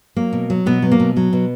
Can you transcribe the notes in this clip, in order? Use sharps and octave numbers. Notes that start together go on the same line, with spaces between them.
F#3 A#3
B2
F#3
B2 B3
F#3
A#3
B2
F#3
B2